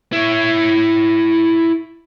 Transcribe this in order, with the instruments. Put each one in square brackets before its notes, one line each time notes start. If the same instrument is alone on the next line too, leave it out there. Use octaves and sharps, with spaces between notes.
[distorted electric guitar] E4 C#5